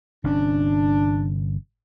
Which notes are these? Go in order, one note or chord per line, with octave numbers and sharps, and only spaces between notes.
G1 C3 C#4 D4